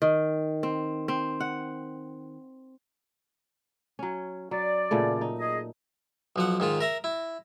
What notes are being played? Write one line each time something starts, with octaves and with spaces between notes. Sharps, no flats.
D#3
C4
C4
F#5
F#3 C#4
F#3 D5
A#2 C#3 A3
D#4
G#4 D#5
B1 F3 F#5
G#2 D#3 F4
A#4 E5 A#5
E4